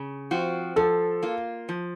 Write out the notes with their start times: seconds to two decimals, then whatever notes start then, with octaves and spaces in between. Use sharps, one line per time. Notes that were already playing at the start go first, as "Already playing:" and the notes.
Already playing: C#3
0.31 F3 C4 F#4
0.76 F3 A4
1.23 A#3 F4
1.69 F3